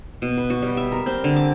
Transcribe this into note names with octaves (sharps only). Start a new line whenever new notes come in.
B2
B4
F#4
G3
E5
A#4
C4
D3
D6